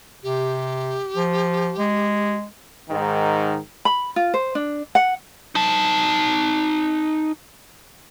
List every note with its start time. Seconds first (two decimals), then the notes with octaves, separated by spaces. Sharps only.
0.23 C3 G4
1.16 F3
1.78 G#3
2.89 G#2 D#3
3.85 B5
4.16 F4
4.34 C5
4.55 D4
4.95 F#5
5.55 D#4 A5